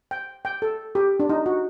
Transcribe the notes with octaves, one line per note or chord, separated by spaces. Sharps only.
G5
G5
A4
G4
D4
D#4
F#4